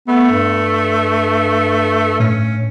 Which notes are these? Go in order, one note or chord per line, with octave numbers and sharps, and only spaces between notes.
A3 B3
G2
A2 C#4